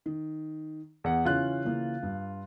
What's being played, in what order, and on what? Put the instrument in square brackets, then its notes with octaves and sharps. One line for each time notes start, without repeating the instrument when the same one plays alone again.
[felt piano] D#3
[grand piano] E2 F#5
[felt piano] C#3 E3 C#4 [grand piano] F4 F#6
[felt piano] C#3 E3 A#3
G2